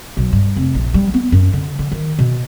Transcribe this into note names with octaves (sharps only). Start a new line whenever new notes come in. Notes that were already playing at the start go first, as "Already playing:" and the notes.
B1
G2
F1
A#1
G3
B3
F#2
D3
D3
D#3
B2